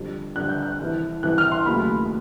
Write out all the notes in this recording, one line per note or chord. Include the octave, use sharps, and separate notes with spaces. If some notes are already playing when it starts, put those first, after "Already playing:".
Already playing: F2 D3 G3
F2 D3 G3 F#6
G6
F#6
C2 C3 E3
C2 C3 E3 F#6
F6
C6
D#2 C#3 F#3 A3 B5